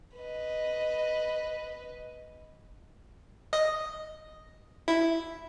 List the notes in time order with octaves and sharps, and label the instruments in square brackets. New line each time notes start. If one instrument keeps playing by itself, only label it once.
[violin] B4 D#5
[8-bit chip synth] D#5
E4